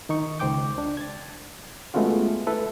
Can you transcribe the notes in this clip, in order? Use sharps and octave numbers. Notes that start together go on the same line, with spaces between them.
D#3 D#4 C#6
C#2 C5 G5 D6 G6
D4
G#6 A6
G#3 A3 B3 C#4 F4 F#4
E4 A4 B4